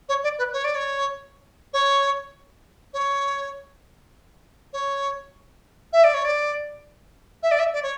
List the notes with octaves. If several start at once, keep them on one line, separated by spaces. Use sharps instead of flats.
C#5
D5
B4
C#5
D5
C#5
C#5
C#5
C#5
E5
D5
C#5
D5
E5
D5
E5
D5
C#5